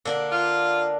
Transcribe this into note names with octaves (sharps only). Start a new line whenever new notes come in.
D3 A#3 D4
F4